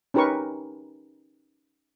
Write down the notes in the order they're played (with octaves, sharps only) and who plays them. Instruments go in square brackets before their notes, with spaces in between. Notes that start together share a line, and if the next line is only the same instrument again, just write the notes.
[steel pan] C#4 D#4 G4 A#4 B4 C#6